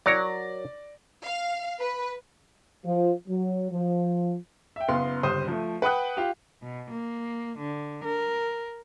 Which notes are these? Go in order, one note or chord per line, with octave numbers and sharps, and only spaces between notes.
F#3 A#4 C#5 D5 A#6
F5
B4
F3
F#3
F3
E5 G5
F#1 B3 F5 C6
G1 C#2 G3 C5 D#6 D#7
F3 A3
B4 F#5 G5 D#6 F#6
F4 G4
B2
A#3
D3
A#4